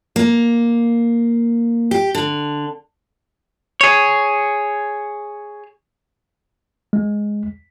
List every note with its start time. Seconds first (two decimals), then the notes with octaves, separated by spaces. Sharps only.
0.16 A#3
1.91 G4
2.15 D3
3.81 G#4 C#5
6.93 G#3